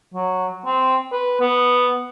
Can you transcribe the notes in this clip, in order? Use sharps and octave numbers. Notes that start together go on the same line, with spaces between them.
F#3
C4
B4
B3